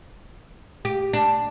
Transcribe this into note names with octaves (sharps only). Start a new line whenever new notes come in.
G4
D4